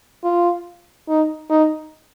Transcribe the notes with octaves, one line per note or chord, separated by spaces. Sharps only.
F4
D#4
D#4